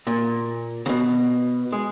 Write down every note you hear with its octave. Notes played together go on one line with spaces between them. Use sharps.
A#2
C#3
B2
G#3